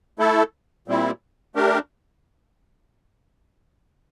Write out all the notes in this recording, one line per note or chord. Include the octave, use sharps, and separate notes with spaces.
A3 E4 A4
A#2 G3 C4 E4
A3 D4 G4 A#4